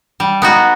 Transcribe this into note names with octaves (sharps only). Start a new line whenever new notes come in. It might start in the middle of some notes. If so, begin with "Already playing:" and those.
G3
B3 D#4 F#4